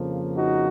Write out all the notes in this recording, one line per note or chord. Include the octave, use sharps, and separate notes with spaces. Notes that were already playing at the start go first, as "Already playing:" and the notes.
Already playing: F2 C#3 F3 A#3
D#4 F#4